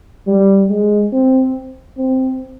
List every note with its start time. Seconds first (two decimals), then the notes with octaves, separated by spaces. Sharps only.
0.27 G3
0.69 G#3
1.12 C4
1.98 C4